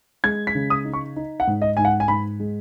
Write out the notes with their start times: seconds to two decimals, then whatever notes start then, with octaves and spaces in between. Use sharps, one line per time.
0.24 G#3 G#6
0.47 B6
0.55 C#3
0.70 D#6
0.85 D#4
0.93 C#6
1.16 D#4
1.40 F#5
1.47 G#2
1.62 D#5
1.77 G#2 G#5
1.85 F#5
2.00 G#5
2.08 G#2 B5
2.40 G#3